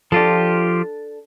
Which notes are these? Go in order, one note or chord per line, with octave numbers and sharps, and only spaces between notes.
F3 D4 F4 G4 A4